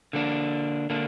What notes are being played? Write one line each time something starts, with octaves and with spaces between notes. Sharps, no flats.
D3 A#3 D4
D3 A#3 D4